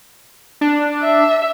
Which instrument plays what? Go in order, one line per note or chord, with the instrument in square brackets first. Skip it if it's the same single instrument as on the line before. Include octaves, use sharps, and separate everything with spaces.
[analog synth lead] D4
[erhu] E5